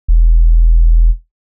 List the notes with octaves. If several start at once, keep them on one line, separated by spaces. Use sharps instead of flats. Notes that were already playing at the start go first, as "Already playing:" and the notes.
E1